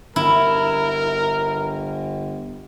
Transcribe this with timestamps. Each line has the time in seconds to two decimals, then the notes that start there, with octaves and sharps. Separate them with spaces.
0.16 G1 E4 A#4